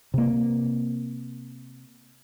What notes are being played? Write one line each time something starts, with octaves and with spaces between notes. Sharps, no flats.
C3 A#3